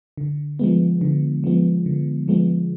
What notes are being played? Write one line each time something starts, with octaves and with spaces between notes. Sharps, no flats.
D3
F3 G#3 B3
D3
F3 G#3 B3
D3
F3 G#3 B3